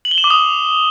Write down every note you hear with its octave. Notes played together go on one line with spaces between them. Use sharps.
F#7
G7
E7
D6
D#6